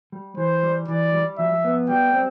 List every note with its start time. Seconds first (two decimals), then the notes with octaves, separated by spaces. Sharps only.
0.12 G3
0.37 E3 C5
0.63 G3
0.88 E3 D5
1.14 G3
1.39 F3 E5
1.64 B3
1.89 G3 G5
2.14 C4